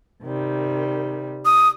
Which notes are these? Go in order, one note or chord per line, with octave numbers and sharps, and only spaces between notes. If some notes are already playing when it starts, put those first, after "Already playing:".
C3 D#3 G3
D#6